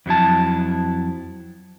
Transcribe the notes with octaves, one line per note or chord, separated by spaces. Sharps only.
F2 F#3 E4 A5